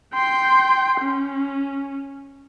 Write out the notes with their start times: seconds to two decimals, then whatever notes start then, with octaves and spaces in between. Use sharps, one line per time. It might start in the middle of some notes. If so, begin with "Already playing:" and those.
0.14 G5 C6
1.01 C#4